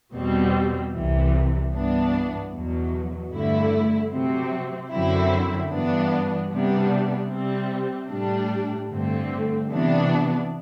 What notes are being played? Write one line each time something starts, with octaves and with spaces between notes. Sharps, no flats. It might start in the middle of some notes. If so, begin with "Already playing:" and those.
E2 B2 G3 C4
C2 C3 E3
G2 E3 B3 D4
E2 B2 F#3
G2 D3 A3 E4
C3 F#3 C4
F#2 D3 F#3 C4 E4
G2 E3 B3 D4
C3 G3 B3 D4
C3 G3 C4
A2 G3 D4
G2 D3 A3 C4
C3 E3 B3 D4